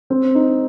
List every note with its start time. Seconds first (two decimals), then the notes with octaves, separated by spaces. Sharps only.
0.10 C4
0.35 D#4